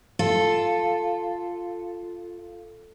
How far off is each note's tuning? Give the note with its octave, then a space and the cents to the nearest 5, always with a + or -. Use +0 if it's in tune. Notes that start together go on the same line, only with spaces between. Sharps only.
F4 +0 A4 +0